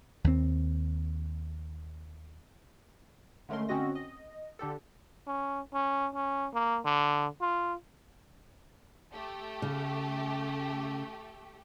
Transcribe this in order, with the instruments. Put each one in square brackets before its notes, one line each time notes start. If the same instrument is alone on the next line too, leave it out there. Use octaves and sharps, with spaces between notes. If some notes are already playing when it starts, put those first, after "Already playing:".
[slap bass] D#2 C4
[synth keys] D3 G#3 A3 C#4 A#4 C6
D3 C4 C#4 F#4 D#5 A#6
D#5
D3 D4 G4 A4
[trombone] C#4
C#4
C#4
A#3
D3
F4
[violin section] A3 G4
[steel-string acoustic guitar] C#3